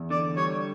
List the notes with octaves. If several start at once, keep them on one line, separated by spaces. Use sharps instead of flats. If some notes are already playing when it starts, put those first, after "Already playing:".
Already playing: E2
D3 D5
G3 C#5